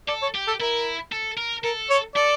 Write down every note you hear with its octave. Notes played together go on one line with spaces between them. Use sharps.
A4 D5
C#5
G4
A4
E4 A#4
A4
A#4
A4 A#4
C#5
A4 D5